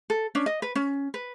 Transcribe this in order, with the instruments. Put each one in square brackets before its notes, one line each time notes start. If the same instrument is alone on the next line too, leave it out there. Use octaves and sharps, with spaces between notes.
[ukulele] A4
C#4 D4
D#5
B4
C#4
B4